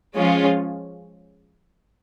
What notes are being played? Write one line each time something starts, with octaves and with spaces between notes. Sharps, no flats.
F3 G#3 C#4 F4